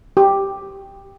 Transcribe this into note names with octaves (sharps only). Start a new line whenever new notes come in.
G4